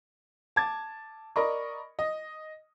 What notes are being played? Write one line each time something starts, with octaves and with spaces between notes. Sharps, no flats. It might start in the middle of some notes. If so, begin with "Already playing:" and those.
A5 D6 G#6 A6
A#4 D5 D#5 B5 C#6
D#5